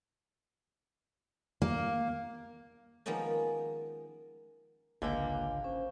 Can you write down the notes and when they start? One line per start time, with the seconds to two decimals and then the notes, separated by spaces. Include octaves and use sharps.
1.62 A#3
3.06 D#3 F3 G#3 A#3 B3 C#4
5.02 G#1 C#2 D3 A#3 G5 G#5
5.64 C#4 C5